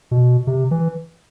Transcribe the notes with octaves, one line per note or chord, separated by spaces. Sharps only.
B2
C3
E3